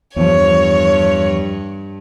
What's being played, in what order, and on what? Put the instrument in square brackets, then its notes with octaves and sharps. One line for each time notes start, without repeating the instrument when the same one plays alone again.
[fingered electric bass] E2 [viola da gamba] G2 [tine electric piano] F3 [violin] C#5